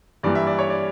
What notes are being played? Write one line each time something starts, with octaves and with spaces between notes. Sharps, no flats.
G2 E3 G3 A#3 D5
E5
D5
C#5
D5